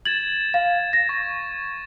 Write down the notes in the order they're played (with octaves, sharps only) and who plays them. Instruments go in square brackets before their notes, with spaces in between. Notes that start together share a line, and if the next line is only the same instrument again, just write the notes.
[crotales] G#6 A6 E7 [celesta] F#7
[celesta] F5
A#6
[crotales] C#6